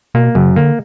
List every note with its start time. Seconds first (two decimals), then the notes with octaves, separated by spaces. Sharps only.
0.14 B2 A#3
0.35 F#2 C#3
0.56 D3 A#3